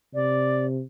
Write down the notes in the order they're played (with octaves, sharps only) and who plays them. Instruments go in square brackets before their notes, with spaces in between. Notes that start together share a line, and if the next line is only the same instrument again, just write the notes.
[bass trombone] C3 [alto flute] D5